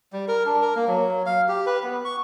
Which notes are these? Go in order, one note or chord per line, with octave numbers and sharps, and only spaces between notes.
G3
A#4
D4
A#4
A#3
F#3
F5
G4
B4
B3
C#6